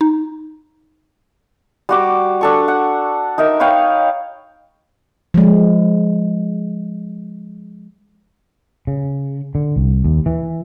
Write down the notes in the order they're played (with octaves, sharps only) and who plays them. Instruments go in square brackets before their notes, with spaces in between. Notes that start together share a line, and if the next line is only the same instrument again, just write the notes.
[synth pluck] D#4
[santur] G3 F#4 D6
D4 A4 C#6
F#5
D#4 A#4 E5
B4 C#5 F5 G5
[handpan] F3 G#3
[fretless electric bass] C#3
D3
C2
D#2
E3